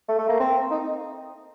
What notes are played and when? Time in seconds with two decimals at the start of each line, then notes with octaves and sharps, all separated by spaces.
0.08 A3
0.19 A3
0.29 A#3
0.40 C4
0.71 D#4